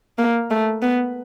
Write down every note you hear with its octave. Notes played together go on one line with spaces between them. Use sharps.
A#3
A3
B3